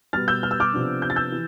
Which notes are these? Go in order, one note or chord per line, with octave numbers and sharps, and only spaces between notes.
B2 G3 B3 F6 A6
E6 G6
F6
E6
D6 F6
C3 F3 B3 D4
G6
A6
E6 G6
E3